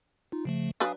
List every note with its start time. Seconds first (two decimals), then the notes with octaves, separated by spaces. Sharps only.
0.32 D#4 F4
0.45 C#3 F3 A3
0.80 F#3 D4 B4 F5 G#5 D#6